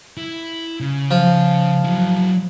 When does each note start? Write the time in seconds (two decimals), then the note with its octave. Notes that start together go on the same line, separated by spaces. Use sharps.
0.17 E4
0.80 C#3
1.11 F3
1.84 F#3 E4